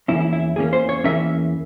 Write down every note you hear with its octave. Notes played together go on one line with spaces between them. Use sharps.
E2 E3 A#3 C#4 E4
E4
E4
E2 E3 A#3 C#4 G#4
C5
C#5
E2 E3 A#3 C#4 E5